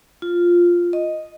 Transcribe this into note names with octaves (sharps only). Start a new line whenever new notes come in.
F4
D#5